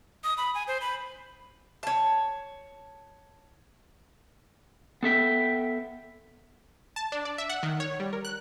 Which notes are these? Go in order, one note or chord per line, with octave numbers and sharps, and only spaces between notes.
D#6
B5
G#5
C5
B5
C#5 A5
B3 A4 E5 G5
A5
D4
D5
E5
F#5
D#3
C#5
G3
A#4
F#6